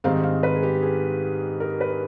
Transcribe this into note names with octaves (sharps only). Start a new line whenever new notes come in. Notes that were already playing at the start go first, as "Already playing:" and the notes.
G#2 D#3 G3 C4 D#4 F5
F5
B4
G#4
G4
G#4
A#4
B4